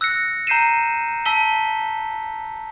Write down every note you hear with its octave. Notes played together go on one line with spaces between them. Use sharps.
E6 F#6 A#6 C#7
A#5 G6 C7 D#7 E7
A5 E6 B6 G7